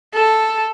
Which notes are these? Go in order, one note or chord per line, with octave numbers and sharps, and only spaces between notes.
A4